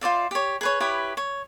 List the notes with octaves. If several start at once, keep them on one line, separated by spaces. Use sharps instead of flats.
F4 C5 D5 E5
G4 C#5
G#4 B4 C#5
E4 G4 B4 C#5
C#5